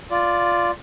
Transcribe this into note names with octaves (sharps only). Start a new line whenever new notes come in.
F4 D5